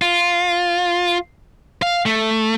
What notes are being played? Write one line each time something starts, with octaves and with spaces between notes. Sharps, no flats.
F4
F5
A3